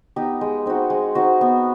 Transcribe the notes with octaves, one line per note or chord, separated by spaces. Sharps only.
B3 D#4 G4
G#3
C4 D#4 F#4
G#3
C4 D#4 F#4
B3